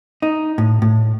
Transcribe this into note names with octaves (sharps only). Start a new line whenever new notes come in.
D#4
A2
A2